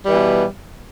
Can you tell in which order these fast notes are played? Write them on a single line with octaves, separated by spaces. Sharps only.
G3 E3 B2